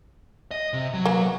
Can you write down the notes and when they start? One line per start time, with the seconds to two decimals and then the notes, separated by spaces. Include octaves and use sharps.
0.51 D#5
0.73 C3
0.94 F#3
1.05 A#3 B3